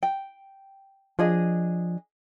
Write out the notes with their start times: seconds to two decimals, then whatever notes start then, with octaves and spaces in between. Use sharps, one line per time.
0.03 G5
1.19 F3 D4 G#4 D#5